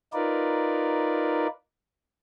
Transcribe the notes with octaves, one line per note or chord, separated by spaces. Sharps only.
D#4 F4 A#4 B4 D5